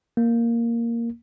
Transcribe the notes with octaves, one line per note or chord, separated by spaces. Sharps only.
A#3